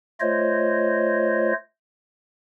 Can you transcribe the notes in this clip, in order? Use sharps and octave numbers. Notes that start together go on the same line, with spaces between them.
A3 F4 C5 C#5 D#5